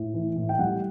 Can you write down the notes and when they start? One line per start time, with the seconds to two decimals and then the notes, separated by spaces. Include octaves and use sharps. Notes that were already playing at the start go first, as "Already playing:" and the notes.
Already playing: A2
0.14 E3
0.36 A2
0.49 G5
0.59 G3 F#5